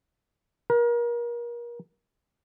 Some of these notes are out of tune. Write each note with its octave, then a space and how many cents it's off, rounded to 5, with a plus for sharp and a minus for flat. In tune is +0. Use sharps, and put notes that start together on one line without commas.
A#4 +30